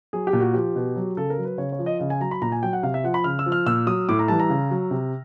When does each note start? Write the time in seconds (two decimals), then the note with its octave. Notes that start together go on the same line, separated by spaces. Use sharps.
0.13 F#3 G#4
0.27 G4
0.33 A#2
0.40 F#4
0.54 F3 G4
0.76 B2
0.96 F#3
1.17 C#3 A4
1.30 A#4
1.38 F#3
1.45 B4
1.58 C#3 C#5
1.72 C#5
1.79 F3
1.86 D#5
2.00 C#3 D#5
2.10 G#5
2.20 F#3 A#5
2.31 B5
2.42 A#2 A#5
2.52 G#5
2.63 F#3 G5
2.73 F#5
2.83 C3 F5
2.94 E5
3.04 F3 F#5
3.14 B5
3.24 C#3 F6
3.39 E6
3.46 F3
3.52 F6
3.66 A#2 E6
3.87 F#3 D#6
4.09 A2 D6
4.19 A#5
4.28 E3 G3 A5
4.40 A#5
4.50 C#3
4.71 F#3
4.91 C3